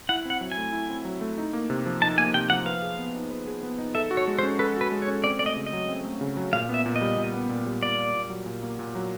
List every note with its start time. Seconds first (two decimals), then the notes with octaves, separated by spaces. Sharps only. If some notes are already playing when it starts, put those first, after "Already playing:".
0.09 E4 F#5
0.25 C4 F#5
0.41 F#3
0.52 G#5
0.57 A3
0.73 E4
0.89 C4
1.05 F#3
1.21 A3
1.38 D#4
1.53 A#3
1.70 C3
1.86 F3
2.02 D#4 A5
2.18 A#3 G#5
2.34 C3 G5
2.50 F3 F#5
2.66 B4 F5
2.82 G#4
2.99 B3
3.15 D#4
3.31 B4
3.47 G#4
3.63 B3
3.79 D#4
3.95 A4 E5
4.11 F#4
4.17 C#5
4.28 G#3
4.39 C5
4.43 C#4
4.59 A4 B4
4.76 F#4 B4
4.92 G#3
5.02 C#5
5.08 C#4
5.24 C4 D5
5.39 A3 D5
5.46 D#5
5.56 C#3
5.67 D#5
5.73 F#3
5.88 C4
6.04 A3
6.21 C#3
6.37 F#3
6.53 A#2 F5
6.69 B3 E5
6.86 A#2
6.96 D#5
7.01 G3
7.18 A#2
7.34 B3
7.49 A#2
7.66 G3
7.82 A#2 D5
7.98 A#3
8.15 A#2
8.30 F#3
8.46 A#2
8.63 A#3
8.79 A#2
8.95 F#3